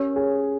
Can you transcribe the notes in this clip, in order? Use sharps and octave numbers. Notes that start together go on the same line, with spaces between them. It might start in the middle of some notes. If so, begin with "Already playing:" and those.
Already playing: C#4 G4 A#4 C#5
G#4